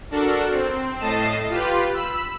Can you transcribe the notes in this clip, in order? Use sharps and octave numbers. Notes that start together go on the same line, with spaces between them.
D4 F#4 A4 A#4
C4
A2 A3 D#5 A5 C7 E7
F4 G4 B4
B5 E6